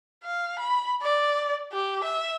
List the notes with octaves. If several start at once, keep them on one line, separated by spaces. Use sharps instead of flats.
F5
B5
D5
G4
E5